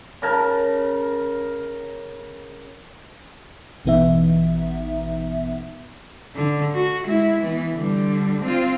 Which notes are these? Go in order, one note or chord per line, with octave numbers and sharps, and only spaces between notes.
C#3 A#4 A5
A1 B2 E3 B3 D#4 E5
D3
F#4
G#3 E4
E3 B3
D3 G3
C4 F4